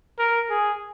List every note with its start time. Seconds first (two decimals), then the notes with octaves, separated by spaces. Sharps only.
0.19 A#4
0.50 G#4